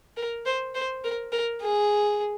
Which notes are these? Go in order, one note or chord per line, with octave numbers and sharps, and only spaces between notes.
A#4
C5
C5
A#4
A#4
G#4